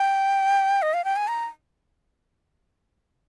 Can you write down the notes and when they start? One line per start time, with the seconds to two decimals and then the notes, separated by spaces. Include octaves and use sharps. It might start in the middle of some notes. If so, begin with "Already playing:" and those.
Already playing: G5
0.82 D#5
0.94 F5
1.05 G5
1.16 G#5
1.28 A#5